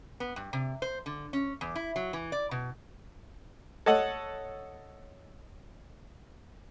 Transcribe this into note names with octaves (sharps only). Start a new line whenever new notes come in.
B3
G2
C3
C5
D3
C#4
E2
E4
F#3
E3
D5
B2
A4 C#5 D#5 F#5